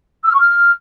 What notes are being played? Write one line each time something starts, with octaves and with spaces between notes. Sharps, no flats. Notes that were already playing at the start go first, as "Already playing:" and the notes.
E6
F6
C#6
F6